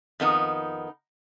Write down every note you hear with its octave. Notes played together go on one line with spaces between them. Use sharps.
F2 D#3 B3 D#4